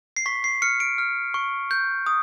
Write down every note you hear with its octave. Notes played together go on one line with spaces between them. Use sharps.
C7
C#6 B6
C7
F6 C#7
D7
F6
C#6
G6
D#6